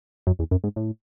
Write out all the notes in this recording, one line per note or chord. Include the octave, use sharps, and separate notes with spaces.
F#2
E2
F#2
G#2
A2